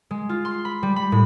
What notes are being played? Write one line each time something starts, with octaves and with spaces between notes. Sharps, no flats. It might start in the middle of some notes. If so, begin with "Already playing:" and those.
G#3
F4
C6
B5
G3
B5
A2